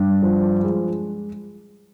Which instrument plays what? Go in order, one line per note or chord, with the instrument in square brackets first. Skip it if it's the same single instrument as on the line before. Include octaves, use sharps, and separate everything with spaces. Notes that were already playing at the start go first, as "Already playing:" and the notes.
Already playing: [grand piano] G2 D4
F3
G#3